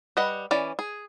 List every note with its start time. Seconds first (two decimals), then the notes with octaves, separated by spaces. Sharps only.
0.17 G3 B4 D#5 F#5
0.51 E3 C#4 D5
0.79 G#4